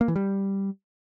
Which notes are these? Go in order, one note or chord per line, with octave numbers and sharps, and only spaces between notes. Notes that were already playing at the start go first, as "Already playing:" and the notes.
A#3
E3
G3